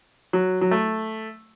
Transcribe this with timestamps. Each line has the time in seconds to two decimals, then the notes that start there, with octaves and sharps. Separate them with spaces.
0.33 F#3
0.61 F#3
0.71 A3